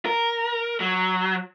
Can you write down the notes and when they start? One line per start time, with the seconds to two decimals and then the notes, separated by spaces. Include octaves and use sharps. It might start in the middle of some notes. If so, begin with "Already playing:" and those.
0.06 A#4
0.80 F#3